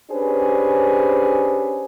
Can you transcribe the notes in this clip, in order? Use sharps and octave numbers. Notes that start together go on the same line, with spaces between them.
C#4 D4 G4 G#4 B4 C5